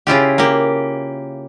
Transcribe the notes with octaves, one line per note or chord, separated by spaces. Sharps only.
C#3 E4 F4 G4
A#3 G4